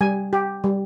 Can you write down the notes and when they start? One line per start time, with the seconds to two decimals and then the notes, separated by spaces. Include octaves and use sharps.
0.01 G3 G#5
0.33 G4
0.64 G3